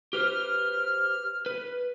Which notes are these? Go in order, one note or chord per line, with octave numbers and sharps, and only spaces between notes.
G4 B4 C5 F6
B4